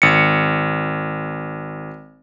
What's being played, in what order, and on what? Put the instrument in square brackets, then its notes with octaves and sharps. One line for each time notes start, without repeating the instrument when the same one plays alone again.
[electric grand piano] G#1 C#7